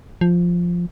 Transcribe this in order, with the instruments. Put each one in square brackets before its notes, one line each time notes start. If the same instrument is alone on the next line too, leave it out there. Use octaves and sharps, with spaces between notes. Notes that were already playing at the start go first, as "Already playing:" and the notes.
[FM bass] F3